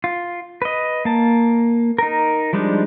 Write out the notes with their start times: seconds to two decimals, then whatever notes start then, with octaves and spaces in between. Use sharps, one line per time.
0.04 F4
0.62 B4 D#5
1.05 A#3 A5
1.98 D#4 A#4
2.53 F3 G3 G#3 D4 D#4